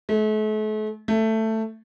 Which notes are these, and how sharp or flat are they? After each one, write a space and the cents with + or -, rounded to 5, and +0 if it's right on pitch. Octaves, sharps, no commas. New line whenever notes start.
A3 -40
A3 +10